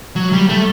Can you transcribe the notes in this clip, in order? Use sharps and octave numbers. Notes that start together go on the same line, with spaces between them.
F#3
G3
A3